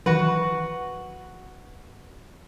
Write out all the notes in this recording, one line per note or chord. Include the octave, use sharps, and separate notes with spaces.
D#3 E3 F#3 F#4 B4